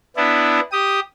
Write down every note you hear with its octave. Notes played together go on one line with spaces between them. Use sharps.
B3 D4 E4
G4 D#6